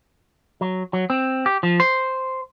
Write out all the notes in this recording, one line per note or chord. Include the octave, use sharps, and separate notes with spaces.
F#3
F#3
C4
G4
F3
C5